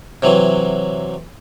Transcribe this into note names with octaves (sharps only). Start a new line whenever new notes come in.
C3 E3 F#3